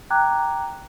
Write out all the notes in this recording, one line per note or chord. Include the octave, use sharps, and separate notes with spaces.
G5 A#5 D6 F#6 G#6